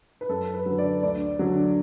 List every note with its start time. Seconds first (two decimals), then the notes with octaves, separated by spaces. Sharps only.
0.21 B4
0.29 F#2 A4
0.54 B4
0.66 D3 F#3
0.78 D5
1.03 D2 D5
1.39 D3 F#3